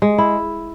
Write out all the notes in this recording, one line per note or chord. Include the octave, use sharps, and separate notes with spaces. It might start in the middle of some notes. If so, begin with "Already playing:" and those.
G#3
E4